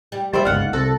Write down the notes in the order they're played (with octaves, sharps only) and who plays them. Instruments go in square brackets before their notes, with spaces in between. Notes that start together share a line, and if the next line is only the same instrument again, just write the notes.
[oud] G3
[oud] D#2 D5 [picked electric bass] G3 [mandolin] C5 E5
[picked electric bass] G1 C#2 G#2 [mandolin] F4 F#5
[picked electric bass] C2 [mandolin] F#4 [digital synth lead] A4